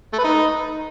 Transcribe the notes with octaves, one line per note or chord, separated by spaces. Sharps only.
A3
B4
D#4